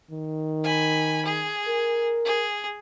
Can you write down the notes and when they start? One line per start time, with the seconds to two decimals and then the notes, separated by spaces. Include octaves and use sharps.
0.11 D#3
0.64 G#5 B5
1.25 G#4
1.68 A#4
2.25 G#4